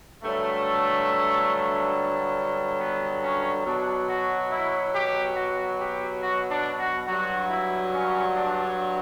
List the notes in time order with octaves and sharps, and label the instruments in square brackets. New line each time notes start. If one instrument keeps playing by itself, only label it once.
[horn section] G2 D3 F#3 A3
B3
C#4
B2 F#3 D4
F#4
E4
G4
F#4
G4
F#4
D4
F#4
G2 F#3 F#4
E4
C#4
D4